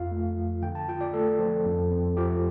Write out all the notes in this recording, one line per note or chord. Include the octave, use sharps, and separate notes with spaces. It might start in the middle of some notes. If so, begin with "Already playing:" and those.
Already playing: F2 F4 F5
A3
F3
D3 G5
A5
F4 G5
D5
A3 A4
F3
F2
C4
F3 G4